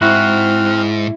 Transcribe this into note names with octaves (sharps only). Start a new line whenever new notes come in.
G#2 C4 E4 F#4 F6